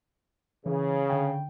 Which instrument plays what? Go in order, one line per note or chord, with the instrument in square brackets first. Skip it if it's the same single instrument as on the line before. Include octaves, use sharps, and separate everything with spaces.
[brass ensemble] C#3 [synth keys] E3
[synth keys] D3 G5